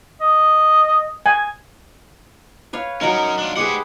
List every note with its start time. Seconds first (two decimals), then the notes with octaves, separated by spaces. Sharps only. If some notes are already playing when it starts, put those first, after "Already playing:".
0.21 D#5
1.26 G#5
2.73 B4 C#5 F5
3.01 F#3 C#4 D#4 A#4
3.38 D4 F4
3.56 G4 G#4 B4 C5 F#5